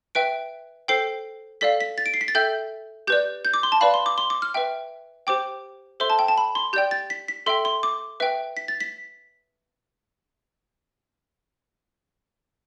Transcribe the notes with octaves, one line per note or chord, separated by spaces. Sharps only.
B4 E5 G5 D7
A4 C5 G5 C7
A4 D5 F5 B6
B6
A6
D7
C7
B6
A6
A4 E5 G5 G6
G4 B4 D5 G6
G6
D6
C6
A5
B4 D5 F5 B5
C6
D6
C6
D6
F6
B4 E5 G5
G4 C5 G5 D6
A4 C5 E5 C6
A5
G5
A5
B5
C6
G4 D5 G5 G6
A6
B6
B6
A4 E5 G5 C6
C6
D6
B4 E5 G5
B6
A6
B6